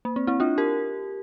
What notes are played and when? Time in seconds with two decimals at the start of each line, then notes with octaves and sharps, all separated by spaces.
0.05 A#3
0.16 C4
0.27 C4 E4
0.40 D4 F4
0.58 G4 A#4